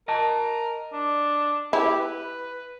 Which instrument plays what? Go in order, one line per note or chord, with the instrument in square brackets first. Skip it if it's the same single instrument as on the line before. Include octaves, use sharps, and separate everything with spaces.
[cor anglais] A#4 [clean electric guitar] D#5 A5
[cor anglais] D4
[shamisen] E4 [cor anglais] G4
[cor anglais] B4